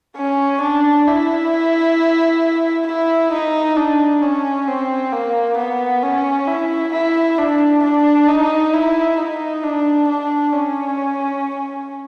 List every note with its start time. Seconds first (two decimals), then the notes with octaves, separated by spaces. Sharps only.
0.17 C#4
0.61 D4
1.07 E4
2.87 E4
3.32 D#4
3.77 D4
4.22 C#4
4.68 C4
5.12 A#3
5.58 B3
6.03 C#4
6.47 E4
6.93 E4
7.38 D4
7.83 D4
8.28 D#4
8.73 E4
9.18 D#4
9.64 D4
10.09 D4
10.53 C#4